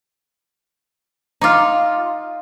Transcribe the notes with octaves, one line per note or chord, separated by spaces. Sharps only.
D#4 F4 A#5 D6 F6